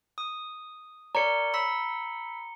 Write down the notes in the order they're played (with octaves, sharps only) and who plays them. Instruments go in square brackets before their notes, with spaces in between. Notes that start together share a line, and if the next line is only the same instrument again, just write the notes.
[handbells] D#6
[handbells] A#4 C#5 D5 [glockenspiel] A#5 C#7 G7
[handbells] B5 E6 B6